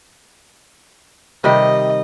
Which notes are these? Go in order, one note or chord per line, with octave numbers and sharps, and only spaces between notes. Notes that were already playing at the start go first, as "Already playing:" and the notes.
C3 D#3 G3 D#5